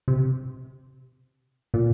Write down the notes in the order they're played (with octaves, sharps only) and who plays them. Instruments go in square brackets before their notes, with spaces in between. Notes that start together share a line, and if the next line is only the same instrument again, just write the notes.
[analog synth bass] C3
A#2